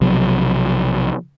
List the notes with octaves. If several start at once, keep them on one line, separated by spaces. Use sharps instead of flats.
B1 C3 F3 F#3